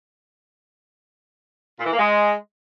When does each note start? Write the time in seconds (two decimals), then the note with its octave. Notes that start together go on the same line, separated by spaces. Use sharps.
1.80 A#2
1.86 E3
1.92 A#3
1.99 G#3